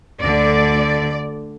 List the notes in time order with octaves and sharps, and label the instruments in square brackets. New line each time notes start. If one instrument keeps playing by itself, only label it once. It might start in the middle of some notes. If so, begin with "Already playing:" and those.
[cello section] D2 D3 D5